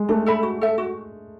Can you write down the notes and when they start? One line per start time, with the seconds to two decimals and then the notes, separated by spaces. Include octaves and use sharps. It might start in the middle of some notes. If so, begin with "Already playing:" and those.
Already playing: G#3
0.09 A3 D4
0.26 A4 E5 B5
0.43 F#4
0.61 A4 E5
0.78 F#4